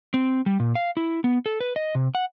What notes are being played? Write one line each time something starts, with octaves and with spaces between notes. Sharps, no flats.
C4
G3
A#2
F5
E4
B3
A4
B4
D#5
C3
F#5